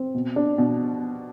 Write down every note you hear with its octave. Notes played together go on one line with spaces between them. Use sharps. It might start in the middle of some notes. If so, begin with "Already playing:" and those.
Already playing: C4
B2
D4
B2